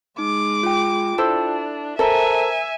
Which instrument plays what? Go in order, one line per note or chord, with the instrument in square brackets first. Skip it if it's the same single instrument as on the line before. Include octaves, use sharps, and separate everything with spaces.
[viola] G#3 D6 [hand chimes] D#4
[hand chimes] F4 G5
[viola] D4 [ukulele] E4 A4 C5
[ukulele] A4 [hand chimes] A#4 C5 A#5 [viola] E5 G#5